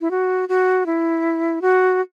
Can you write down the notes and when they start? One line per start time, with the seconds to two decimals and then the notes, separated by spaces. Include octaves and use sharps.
0.01 E4
0.11 F#4
0.49 F#4
0.86 E4
1.62 F#4